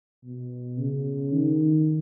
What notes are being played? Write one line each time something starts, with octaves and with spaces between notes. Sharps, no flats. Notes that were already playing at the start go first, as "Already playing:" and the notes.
B2
C#3
D#3